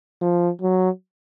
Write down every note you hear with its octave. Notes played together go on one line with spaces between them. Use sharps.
F3
F#3